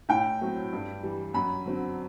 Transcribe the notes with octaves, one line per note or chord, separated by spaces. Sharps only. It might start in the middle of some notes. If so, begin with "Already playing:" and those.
A2 G5
F#3 A3 C4
G2
E3 G3
F#2 B5
D3 F#3 C4